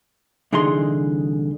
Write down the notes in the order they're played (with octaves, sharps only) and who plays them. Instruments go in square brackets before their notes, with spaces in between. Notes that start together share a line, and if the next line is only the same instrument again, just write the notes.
[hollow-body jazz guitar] C2 D3 E3 D#4 G#4 C6